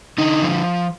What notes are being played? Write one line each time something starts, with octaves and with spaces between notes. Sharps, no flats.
D3 D#4
F3